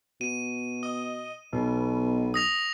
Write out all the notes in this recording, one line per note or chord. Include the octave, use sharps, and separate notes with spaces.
B2 D#7
D#5
B1 B2
D#6 A#6 F7